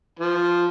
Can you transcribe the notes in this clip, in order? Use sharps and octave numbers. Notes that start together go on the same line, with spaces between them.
F3